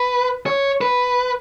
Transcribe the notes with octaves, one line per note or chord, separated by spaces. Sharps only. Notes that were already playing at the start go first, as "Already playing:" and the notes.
Already playing: B4
C#5
B4